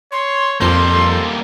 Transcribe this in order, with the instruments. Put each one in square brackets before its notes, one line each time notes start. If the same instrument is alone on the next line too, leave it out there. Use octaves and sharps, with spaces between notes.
[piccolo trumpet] C#5 [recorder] C6
[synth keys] F2 G6 [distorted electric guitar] G3 A#3 [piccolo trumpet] A4 [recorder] C6